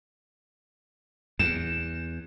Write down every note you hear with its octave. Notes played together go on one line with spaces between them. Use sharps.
E2 E7